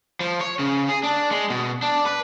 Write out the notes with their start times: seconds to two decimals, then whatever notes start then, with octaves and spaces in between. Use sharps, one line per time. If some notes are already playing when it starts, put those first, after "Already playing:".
0.21 F3
0.41 C#5
0.59 C#3
0.89 G#4
1.04 D4
1.32 G#3
1.50 B2
1.82 D4
2.06 B4